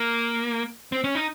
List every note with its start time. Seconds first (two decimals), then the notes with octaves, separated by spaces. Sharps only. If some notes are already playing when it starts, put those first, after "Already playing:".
Already playing: A#3
0.92 C4
1.04 C#4
1.15 D#4